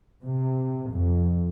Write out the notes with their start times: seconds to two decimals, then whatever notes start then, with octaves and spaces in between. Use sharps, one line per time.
0.23 C3
0.92 F2